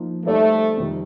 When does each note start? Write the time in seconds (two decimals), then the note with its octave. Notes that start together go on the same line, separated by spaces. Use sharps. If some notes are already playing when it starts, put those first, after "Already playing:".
Already playing: F3 A#3 D#4
0.25 G3 A3 C4 D#4 A4 D5
0.77 F2 C3 D#3 G3 C4